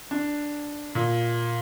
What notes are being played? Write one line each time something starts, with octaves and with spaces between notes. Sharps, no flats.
D4
A#2